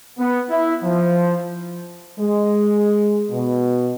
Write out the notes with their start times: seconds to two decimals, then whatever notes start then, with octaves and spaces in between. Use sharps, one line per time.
0.18 B3
0.50 E4
0.83 F3
2.18 G#3
3.30 B2